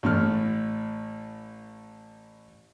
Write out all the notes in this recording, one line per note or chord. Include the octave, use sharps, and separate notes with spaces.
A1 A2 F6